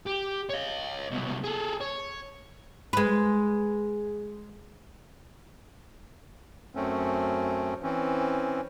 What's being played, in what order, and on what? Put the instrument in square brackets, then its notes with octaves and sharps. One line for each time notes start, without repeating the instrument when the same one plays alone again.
[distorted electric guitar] G4
C#5 D#5
C2 B2
G#4 A4
C#5
[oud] G#3 B4
[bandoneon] F#2 A3 C4 C#4
E3 C4 C#4